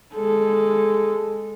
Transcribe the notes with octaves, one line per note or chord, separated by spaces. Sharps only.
G#3 A4